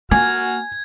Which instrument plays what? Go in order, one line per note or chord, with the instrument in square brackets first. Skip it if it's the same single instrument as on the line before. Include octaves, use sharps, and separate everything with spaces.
[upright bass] A#3 [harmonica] F#4 F6 [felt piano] G#5 [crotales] G#6